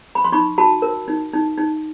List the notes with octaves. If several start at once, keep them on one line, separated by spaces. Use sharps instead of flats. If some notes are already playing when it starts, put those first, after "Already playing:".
B5
C6
D#4 B5 C#6
F#4 A5 B5
A#4
D#4
D#4
D#4